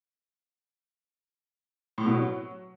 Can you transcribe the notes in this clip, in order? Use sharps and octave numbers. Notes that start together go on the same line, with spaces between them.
A2
B2
F#3